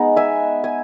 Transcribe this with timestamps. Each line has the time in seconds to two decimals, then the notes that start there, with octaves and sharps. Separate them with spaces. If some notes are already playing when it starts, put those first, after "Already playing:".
Already playing: G#3 B3 D#4 F#5
0.16 E5 G#5
0.64 G#5